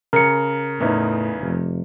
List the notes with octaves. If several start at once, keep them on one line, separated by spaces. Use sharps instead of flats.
C#3 A#4 C#7
E2 A2 B3 D#4
F1